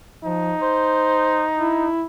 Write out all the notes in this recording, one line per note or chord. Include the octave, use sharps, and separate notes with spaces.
F3 D#4
C5
E4